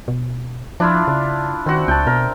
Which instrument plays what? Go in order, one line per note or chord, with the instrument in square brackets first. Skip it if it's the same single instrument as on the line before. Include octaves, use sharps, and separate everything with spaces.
[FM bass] B2
[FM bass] F3 [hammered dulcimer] D4 E4 F4
[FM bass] C#3
[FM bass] D#3 [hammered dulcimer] C4 F#4
[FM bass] C#2 [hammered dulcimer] G5 A5
[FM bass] B2 [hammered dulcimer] A#4